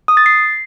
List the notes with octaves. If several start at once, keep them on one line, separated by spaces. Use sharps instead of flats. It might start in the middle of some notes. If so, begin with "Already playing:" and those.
D#6
A6
C7